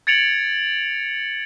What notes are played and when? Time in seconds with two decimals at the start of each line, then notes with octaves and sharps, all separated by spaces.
0.07 G#6 A6 C#7 D7 F7 F#7